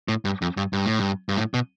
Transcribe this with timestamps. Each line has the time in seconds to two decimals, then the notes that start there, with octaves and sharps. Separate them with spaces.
0.08 A2
0.25 G2
0.42 F2
0.57 G2
0.73 G2
0.86 A2
0.99 G2
1.29 G2
1.37 A2
1.54 B2